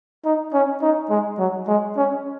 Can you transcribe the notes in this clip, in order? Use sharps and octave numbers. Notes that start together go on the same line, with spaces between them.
D#4
C#4
D#4
G#3
F#3
G#3
C#4